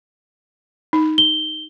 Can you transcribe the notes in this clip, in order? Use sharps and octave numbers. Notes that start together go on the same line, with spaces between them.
D#4
G7